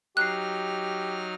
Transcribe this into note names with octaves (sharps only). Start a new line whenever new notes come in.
F#3 D#4 G4 F6 F#6 C7